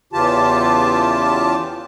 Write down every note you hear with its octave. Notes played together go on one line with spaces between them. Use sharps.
E2 C#3 E3 F4 G4 A5